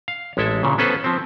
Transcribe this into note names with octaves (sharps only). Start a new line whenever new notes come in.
F5
A1 G#3 E4 A4 E5
A#2 C#3
B3 C#4 A4 B4 C5
F3 C4